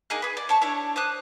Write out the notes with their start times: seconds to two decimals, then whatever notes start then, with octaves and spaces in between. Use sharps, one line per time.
0.10 A#3 D#4 G#4 F#6
0.22 G#4 B4
0.37 D5
0.49 C#5 A5 C#6
0.62 D4 E4 C#5
0.96 C5 D6 D#6 F#6